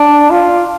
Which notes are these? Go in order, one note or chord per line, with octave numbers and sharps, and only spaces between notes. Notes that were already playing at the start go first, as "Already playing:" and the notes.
Already playing: D4
F4